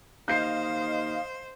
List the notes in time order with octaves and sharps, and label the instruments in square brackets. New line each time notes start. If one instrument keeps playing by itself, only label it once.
[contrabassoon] D#2 [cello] C5 [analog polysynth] D#5 F5 [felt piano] G6 C7